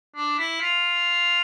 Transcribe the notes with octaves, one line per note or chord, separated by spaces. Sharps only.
D4
E4
F4